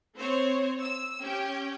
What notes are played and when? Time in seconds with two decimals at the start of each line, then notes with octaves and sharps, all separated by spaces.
0.17 C4 C5 C#5
0.81 E6
1.22 C#4 G4 G5